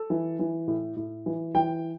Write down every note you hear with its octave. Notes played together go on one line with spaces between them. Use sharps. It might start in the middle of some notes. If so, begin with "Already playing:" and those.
Already playing: A4
E3
E3
A2
A2
E3
E3 G5